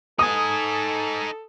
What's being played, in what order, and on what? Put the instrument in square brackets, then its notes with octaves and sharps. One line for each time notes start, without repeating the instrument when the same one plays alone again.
[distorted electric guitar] D#4 G#5 [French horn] A4 [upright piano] D#6